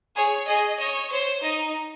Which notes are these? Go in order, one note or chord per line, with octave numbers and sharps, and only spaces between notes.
G#4 C#5
G#4 D#5
C#5 D#5
C5 C#5
D#4 D#5